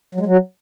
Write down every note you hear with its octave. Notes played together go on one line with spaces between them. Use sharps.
F#3
G#3
F#3